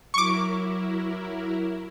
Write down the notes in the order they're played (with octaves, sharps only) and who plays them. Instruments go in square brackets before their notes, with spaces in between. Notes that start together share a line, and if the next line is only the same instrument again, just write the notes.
[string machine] F#3 E4 A#4 [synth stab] C#6 D6